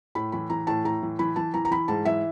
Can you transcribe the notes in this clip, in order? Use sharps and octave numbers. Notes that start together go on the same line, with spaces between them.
A2 B5
E3 B5
E3 A#5
A2 A5
A2 A#5
E3
E3 B5
E3 A5
E3 A#5
A#5
E3 B5
G#2 A5
E3 E5